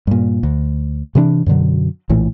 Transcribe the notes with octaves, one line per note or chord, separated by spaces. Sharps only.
G2 A#2
D2
C3 E3 C4 D4
F#2 B2 D3 F#3
A#1 A2 E3